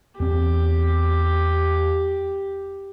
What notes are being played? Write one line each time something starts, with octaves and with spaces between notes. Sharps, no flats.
E2 C4 G4